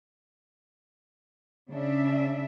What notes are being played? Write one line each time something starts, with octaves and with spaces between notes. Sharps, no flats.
C#3 D4 E5